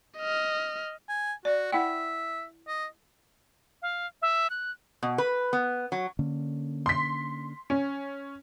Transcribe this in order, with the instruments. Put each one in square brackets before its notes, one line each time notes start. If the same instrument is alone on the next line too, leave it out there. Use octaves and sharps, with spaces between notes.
[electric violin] D#5 F6
[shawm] G#5
[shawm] F#4 [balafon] D5
[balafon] E4 F#5 G5 [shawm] E5
[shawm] D#5
[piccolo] F5
E5
F#6
[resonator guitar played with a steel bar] B2
B4
B3
F#3
[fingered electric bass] D3 A#3 C#4
[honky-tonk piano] C6 B6
C#4